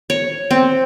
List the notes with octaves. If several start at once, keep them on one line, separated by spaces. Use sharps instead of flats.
C#5
C4